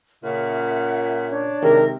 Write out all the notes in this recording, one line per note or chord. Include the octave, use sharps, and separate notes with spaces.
A#2 C#3 E5 F#5
D4 C#5
C3 D#3 G#3 A#4